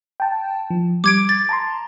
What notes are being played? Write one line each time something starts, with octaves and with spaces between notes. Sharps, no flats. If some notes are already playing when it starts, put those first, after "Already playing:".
G5 A5
F3
G3 D6 G#6 D7
A6
A5 A#5 C6